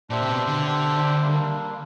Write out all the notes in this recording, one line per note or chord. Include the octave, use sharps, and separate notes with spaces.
A#2 D4 G4 C5 E5
C3
B2
D3
D4 G4 C5 E5
G3 A#3 D4